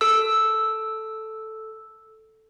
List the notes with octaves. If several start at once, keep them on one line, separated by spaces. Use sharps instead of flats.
A4 E6